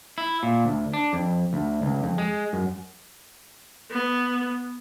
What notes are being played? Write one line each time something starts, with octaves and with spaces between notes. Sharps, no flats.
E4
A#2
D2
D4
F2
D2
C#2
F2
G#3
F#2
B3